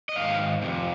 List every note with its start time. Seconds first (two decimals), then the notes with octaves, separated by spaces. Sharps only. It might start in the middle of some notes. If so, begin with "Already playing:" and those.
0.09 D#5
0.16 G#2 D#3 F5
0.62 F2 C3